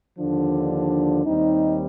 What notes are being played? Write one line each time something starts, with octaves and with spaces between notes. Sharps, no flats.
D#2 D3 F3 D4
D#2 D#3 G3 C4 D#4